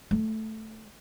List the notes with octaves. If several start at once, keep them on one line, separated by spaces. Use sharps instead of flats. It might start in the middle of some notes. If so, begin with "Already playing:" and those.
A3